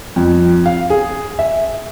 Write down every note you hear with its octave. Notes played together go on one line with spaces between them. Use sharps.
F2
F5
G#4
E5